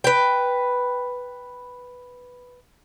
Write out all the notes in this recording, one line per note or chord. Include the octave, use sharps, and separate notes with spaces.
B4 G5